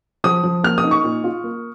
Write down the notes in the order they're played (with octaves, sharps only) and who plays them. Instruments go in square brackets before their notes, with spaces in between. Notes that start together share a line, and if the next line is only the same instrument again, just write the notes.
[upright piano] F3 D#6
F3
A#3 F6
D#6
D#4
C#6
A#2
F4
A#3